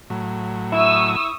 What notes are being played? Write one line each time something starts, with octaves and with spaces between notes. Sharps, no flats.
A2 F#3
E4 C#6 D#6 E6